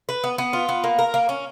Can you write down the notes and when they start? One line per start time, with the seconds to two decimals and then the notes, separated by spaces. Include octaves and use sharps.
0.09 B4
0.24 B3
0.38 B3
0.53 F4
0.69 B3
0.84 A#3
0.99 A#4
1.14 A#3
1.29 C#4